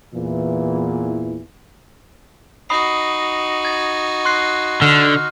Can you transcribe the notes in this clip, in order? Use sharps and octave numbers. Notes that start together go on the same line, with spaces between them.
E2 A#2 E3
D#4 F#4 B5 D#6 C7
G#6 A6
C6 F#6 C7
D3 F6